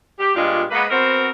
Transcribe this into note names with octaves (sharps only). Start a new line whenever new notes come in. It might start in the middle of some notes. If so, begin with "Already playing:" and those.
G4
G2 A#2 G#3 D4 F4
G#3 A#3 B3 B4
B3 C4 F#4 A#4 C5